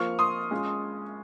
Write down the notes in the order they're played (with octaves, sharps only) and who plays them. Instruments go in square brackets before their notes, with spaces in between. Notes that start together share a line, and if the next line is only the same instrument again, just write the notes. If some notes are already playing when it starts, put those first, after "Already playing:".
Already playing: [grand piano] F3 A#3 F4 [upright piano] C#6 F6
[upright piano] C6 D#6
[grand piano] G#3 C#4 F4